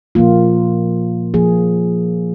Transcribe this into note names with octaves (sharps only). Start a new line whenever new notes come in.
A#2 F3 A#3 F4
F3 A#3 G#4